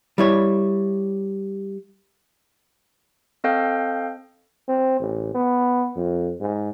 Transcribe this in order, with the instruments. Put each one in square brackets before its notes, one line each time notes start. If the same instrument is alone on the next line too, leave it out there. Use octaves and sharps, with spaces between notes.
[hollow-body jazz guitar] G3 E4 C#5
[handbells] C4 A4 D#5 F5 G5 G6
[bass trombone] C4
A1
B3
F2
G#2